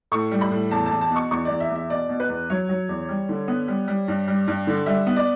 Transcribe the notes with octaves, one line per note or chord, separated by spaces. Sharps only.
A2 C#6
G3
B5
A2
E2 A5
A5
E2
A5
B2
C#6
E2 C#6
E2 D5
E5
E2
E5
B2 D5
B2
B4
E2
F#3 C#5
F#3
E2
G3
D3
B3
G3
G3
G2
G3
G2
D3
G3 E5
B3
D5